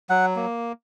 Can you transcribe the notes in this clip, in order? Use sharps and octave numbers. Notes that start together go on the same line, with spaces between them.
F#3 F#5
A#3